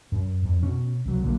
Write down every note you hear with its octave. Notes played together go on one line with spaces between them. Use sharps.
F#2
F2
B2 C#4
C2 F#3
A#1 D3 F#3 A#3